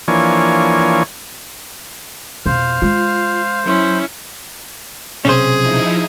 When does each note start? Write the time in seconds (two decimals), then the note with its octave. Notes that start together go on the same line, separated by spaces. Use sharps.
0.08 E3 F3 A#3 D4 C#5 G#5
2.46 F2 B2 C5 F5
2.82 G#3 F4
3.66 F#3 C#4 E4 C6
5.25 B1 C3 C#4 G#4 C5
5.57 F3 D#4 E4